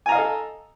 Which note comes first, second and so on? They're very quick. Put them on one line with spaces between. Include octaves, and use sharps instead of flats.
G#5 A#5 F5 D#5 A4